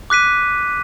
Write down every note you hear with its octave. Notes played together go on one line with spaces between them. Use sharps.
D6 F#6 B6 D#7